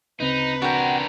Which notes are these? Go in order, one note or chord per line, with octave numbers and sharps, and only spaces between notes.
D2 C#3 C4 D#4 B4
D4 F#4 A#4 G5